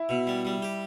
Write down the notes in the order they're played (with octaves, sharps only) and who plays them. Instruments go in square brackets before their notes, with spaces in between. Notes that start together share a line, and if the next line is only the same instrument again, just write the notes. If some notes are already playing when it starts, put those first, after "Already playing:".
Already playing: [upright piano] E4
[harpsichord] B2
G3
G3
G4